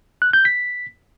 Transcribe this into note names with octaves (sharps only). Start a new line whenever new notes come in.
F#6
G6
B6